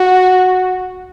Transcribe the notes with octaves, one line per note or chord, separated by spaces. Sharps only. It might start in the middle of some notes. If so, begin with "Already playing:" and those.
Already playing: F#4